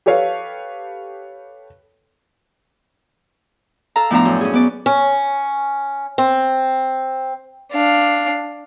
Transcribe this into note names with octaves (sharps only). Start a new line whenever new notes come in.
G4 A4 B4 C#5 F5
A4 F5 A#5
A2 F3 B3 D4 F5 A#5
F#2
C#4 G#4
B3 D5
C#4
C4
D4 F5